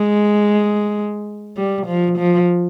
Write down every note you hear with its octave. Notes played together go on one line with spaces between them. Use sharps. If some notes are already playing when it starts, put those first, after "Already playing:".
Already playing: G#3
G3
F3
F3